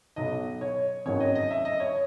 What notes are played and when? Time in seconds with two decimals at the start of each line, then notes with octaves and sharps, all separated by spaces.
0.16 B1 B2 F#3 D#5
0.61 C#5
1.06 G#1 F#2 D#3 F#3 C#5
1.20 D#5
1.35 D#5
1.51 E5
1.65 D#5
1.80 C#5